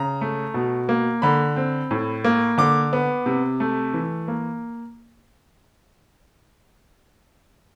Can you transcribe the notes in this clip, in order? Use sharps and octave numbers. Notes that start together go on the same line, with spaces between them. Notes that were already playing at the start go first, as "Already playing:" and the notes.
Already playing: C#3 A#5
A3
B2
A#3
D3 B5
C4
A2
A#3
D3 D6
B3
C3
A3
E3
A#3